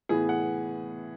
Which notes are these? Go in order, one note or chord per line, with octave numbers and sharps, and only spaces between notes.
A2 E3 B3 G#4
F#5